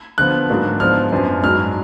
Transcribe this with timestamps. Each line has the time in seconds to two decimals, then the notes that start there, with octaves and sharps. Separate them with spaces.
0.18 D3 F3 B3 F#6
0.49 G#2 F#3 A#3 D4
0.80 G#2 F3 B3 D4 F6
1.12 F#2 F3 B3 D4
1.43 G#2 F#3 D4 F6